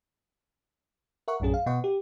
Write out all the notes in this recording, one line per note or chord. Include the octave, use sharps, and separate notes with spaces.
A#4 E5 F#5 C#6
A#1 F#2 A2 C#4 G#4
F5
B2 B3 D#5 F#5 C#6
G4